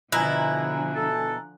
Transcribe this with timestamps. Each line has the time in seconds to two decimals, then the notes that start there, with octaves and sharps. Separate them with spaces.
0.12 B2 D3 F3 E4 G#5 A#5 F#6
0.95 A4